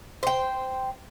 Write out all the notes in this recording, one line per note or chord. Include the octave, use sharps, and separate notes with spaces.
C5 G5